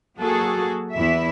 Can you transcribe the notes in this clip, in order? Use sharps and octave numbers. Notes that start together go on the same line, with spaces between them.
F#3 A#3 F#4 G#4 A4
E2 E4 E5